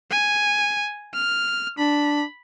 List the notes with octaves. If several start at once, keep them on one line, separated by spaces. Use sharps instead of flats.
G#5
F6
D4 B5